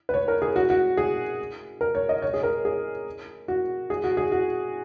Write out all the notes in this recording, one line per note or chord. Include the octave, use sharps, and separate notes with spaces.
B4
C#5
A#4
G#4
F#4
F#4
G#4
A#4
C#5
D#5
C#5
G#4
A#4
G#4
F#4
G#4
F#4
G#4
F#4